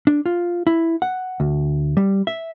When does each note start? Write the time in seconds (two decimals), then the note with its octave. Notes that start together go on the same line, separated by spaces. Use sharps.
0.07 D4
0.26 F4
0.67 E4
1.02 F#5
1.40 D2
1.97 G3
2.27 E5